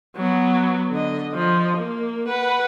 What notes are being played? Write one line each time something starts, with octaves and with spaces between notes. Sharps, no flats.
F#3 B3
D3 D#5
F3 D#5
A#3
B4 F#5